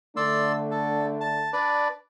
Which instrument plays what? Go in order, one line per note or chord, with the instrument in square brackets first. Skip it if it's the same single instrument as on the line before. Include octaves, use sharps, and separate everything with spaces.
[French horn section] D3 A3 D4 [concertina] D5 C6 E6
[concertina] A4
A5
D4 B4 D5